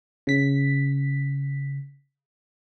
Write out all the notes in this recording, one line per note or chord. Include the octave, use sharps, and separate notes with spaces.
C#3 B6